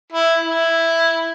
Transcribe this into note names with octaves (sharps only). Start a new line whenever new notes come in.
E4
E4